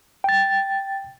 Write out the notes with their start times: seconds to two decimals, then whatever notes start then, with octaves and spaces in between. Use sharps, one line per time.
0.24 G5 A6